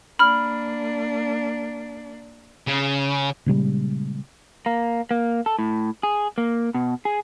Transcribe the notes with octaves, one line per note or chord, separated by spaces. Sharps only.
A#3 D4 B5 F6
C#3
A#2 C#3 G3 G#3
A#3
A#3
A4
A2
G#4
A#3
B2
G#4